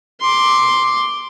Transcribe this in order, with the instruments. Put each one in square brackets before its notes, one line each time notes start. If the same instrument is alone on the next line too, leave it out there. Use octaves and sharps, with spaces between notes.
[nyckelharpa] C6 D6